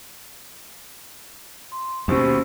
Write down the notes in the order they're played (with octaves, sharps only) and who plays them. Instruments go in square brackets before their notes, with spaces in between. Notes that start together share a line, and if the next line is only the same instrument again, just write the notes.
[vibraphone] C6
[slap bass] D#2 B2 [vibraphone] C#4 G4 C5